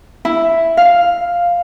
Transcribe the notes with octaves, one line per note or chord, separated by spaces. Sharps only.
E4
F5